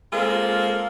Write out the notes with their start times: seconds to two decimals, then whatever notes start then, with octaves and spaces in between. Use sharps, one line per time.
0.13 G#3 A#3 C4 F4 A4